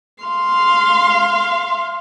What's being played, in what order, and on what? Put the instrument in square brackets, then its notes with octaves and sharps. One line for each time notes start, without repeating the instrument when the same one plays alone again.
[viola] F5 C6